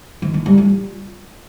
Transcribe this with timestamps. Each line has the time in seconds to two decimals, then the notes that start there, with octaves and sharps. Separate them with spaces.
0.22 D#3
0.34 D4
0.46 G3
0.58 F4